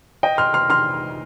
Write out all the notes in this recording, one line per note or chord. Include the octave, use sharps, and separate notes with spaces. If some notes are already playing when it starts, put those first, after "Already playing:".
D#5 G5
C6 F6
C6 F6
C6 F6